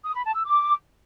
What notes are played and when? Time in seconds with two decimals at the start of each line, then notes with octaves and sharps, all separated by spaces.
0.04 D#6
0.15 B5
0.25 A5
0.35 E6
0.45 D6